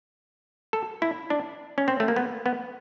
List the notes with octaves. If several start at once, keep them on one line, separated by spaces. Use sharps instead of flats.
A4
E4
D4
C#4
C4
A3
A#3
B3
B3